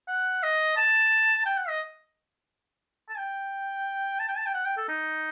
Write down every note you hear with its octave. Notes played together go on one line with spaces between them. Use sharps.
F#5
D#5
A5
G5
F#5
D#5
A5
G5
A5
G5
A5
G5
F#5
G5
A4
D#4